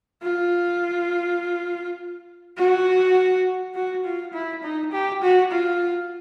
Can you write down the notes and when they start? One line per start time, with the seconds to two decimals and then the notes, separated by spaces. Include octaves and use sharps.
0.22 F4
2.58 F#4
3.74 F#4
4.04 F4
4.33 E4
4.63 D#4
4.92 G4
5.22 F#4
5.51 F4